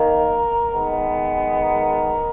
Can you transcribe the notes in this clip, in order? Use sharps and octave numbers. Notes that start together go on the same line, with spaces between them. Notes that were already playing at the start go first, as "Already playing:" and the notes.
Already playing: D#3 A#3 A#4
D#3 G#3 B3
A#4